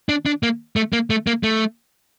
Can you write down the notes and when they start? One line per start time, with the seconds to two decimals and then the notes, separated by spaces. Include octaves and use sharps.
0.09 D4
0.26 D4
0.43 A#3
0.76 A3
0.93 A#3
1.10 A3
1.27 A#3
1.43 A3